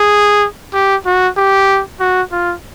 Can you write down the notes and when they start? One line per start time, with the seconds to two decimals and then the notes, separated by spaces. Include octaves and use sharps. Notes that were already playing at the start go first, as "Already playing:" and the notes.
Already playing: G#4
0.74 G4
1.06 F#4
1.37 G4
2.00 F#4
2.32 F4